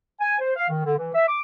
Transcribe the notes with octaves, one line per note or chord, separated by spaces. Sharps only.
G#5
C5
F5
D#3
D3
E3
E5
D6